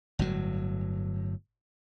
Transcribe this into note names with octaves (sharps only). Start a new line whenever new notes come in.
G1 A2 F#3